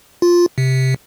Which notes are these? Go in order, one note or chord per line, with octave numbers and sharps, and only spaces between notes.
F4
C3